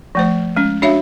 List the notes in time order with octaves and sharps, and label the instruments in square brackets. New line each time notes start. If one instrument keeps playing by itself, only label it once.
[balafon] F3 A3 C5
G#3 C#4
D4 F#4 C#5 E5 F5